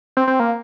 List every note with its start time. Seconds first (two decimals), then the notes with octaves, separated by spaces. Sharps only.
0.17 C4
0.28 C4
0.40 A#3